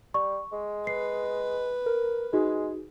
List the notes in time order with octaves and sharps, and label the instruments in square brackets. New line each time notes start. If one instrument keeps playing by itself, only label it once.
[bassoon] G3 [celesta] C#6
[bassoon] G#3
[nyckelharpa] B4 [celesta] C7
[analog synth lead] A#4
[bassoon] G#3 [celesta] D#4 F#4 [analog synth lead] G#4